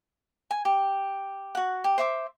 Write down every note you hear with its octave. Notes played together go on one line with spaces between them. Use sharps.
G#5
G4
F#4 F#5
G4
C5 E5 D6